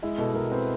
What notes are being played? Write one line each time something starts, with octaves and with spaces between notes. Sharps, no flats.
G#3 E4
B2 A4
B2 A#4
C4 B4